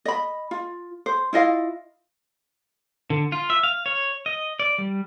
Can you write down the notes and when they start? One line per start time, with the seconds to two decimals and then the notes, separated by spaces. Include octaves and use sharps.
0.05 D#5 B5
0.51 F4
1.06 C5
1.33 E4 F4 D#5 F5
3.10 D3
3.32 F4
3.50 E5
3.63 F5
3.86 C#5
4.26 D#5
4.60 D5
4.78 G3